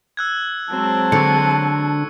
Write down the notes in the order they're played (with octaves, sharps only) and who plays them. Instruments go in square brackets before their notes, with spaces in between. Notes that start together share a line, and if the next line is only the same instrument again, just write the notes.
[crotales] E6 F#6 G#6
[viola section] F#3 G#3 C4 [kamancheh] A5
[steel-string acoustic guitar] D3 [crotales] C#6 C#7